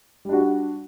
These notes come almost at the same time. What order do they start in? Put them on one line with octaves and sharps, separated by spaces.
G3 D4 F#4